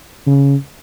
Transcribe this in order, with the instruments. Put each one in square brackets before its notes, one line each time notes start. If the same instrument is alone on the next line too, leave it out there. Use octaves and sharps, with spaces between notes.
[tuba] C#3